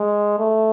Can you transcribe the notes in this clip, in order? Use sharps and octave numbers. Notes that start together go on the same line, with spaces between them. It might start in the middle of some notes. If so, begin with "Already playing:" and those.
Already playing: G#3
A3